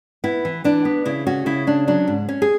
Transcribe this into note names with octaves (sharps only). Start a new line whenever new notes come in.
B3 E4
E3
E3 D4
B3
C#3 E4
C#4 F#4
C#3 E4
C#4 D4
F#3 D4
G#2
C#4
G#4